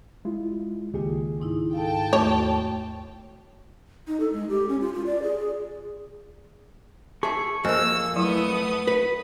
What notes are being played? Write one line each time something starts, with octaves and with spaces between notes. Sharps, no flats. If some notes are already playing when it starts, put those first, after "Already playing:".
G#3 E4 F4
C#2 D#3 A#3 F4 G4 G#4
G#2 D#4 E4
A4 F5 G5 A5
D#2 A3 F#4 C#5
D#4
A4
G#3
G4
C#4
F4
F4
D5
G#4
G#4
G#4 E5 A5 C#6
F2 A#3 G#4 D#5 G#5 E6
F3 F#3 A3 B3 E4 D#6
B4